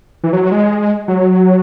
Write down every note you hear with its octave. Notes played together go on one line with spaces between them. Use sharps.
E3
F#3
F#3
G#3
F#3